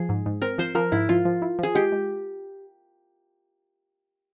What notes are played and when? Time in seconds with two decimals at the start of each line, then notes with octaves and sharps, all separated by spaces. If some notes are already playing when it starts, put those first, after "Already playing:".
Already playing: F3 G#4
0.09 G#2
0.26 G#2
0.42 C4 A#4
0.58 F3 C5
0.75 F3 A#4
0.92 G#2 E4
1.09 F3 F4
1.25 F3
1.42 E4
1.59 F3 G#4
1.75 G#3 G4
1.92 G#3